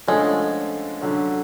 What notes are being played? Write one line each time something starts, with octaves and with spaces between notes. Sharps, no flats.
D3 F3 G#3 A3 C#4
D3 F#3 C#4